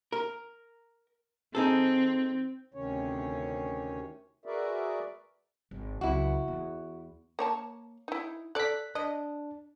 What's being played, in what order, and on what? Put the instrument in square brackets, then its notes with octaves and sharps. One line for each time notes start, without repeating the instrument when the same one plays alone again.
[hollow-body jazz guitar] A#4
[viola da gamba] C4 [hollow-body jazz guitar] D#4 G#4 A4
[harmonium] D2 C3 D#3 C#4 C#5
F#4 G#4 A#4 B4 D5 E5
[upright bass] G#1
[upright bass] C#2 F#3 [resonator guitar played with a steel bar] E4 F#4
[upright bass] E2
[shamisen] A#3 C#5 A5
D#4 E4
[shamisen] A4 D5 [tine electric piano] F#6 B6
[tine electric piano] D4 [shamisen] D#5